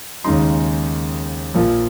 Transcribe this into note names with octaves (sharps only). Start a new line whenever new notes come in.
D#2 C#3 G#3 D#4 C6
A#1 A#2 F3